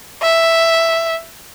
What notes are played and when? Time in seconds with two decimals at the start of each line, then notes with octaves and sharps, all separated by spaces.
0.23 E5